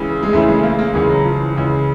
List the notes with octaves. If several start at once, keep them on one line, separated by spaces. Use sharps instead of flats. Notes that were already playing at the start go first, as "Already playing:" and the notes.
Already playing: C#2 C#3 E3
G#3
C#2 C#3 E3 A3
G#3
A3
A#3
A#3
C#2 C#3 E3 G#3
F#3
F3
E3
C#2 C#3 E3